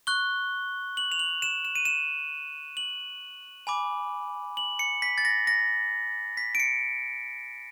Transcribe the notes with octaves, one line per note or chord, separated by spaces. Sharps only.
C#6 F#6 G7
F#7
F7
F#7
E7
E7
D#7
E7
F#7
G#5 B5 D6
F#7
C#7
B6
A6
A#6
A#6
B6
D7
C#7